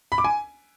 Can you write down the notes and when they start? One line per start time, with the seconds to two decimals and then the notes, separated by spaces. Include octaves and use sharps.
0.12 B5
0.18 D6
0.24 G#5